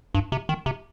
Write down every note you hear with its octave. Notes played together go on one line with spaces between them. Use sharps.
G2
C3
D#3
C3